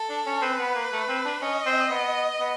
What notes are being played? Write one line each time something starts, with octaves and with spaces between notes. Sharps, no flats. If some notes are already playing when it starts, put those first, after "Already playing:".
Already playing: A4
D4
C#4
C4 B4
B3
A#3
A3
C4
D4
C#4 D#5
C4
B3
B3